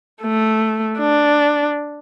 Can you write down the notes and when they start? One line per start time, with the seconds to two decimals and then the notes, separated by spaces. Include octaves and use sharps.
0.22 A3
0.99 D4